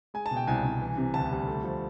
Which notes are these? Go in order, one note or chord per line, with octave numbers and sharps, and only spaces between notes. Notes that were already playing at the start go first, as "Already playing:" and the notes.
G#3 G#5
A5
B2
G5
C2 G#5
C2
E3
C3
D2 A5
G3
A3
F3